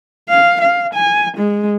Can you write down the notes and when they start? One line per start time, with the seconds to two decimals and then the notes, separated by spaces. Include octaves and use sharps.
0.29 F5
0.61 F5
0.94 G#5
1.37 G#3